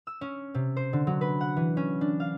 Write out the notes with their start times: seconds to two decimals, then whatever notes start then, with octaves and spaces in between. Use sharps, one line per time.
0.07 E6
0.21 C#4
0.54 C3
0.76 C5
0.93 D3
1.07 F#3
1.21 B4
1.41 F#5
1.56 E3
1.77 C#4
2.01 D4
2.20 F5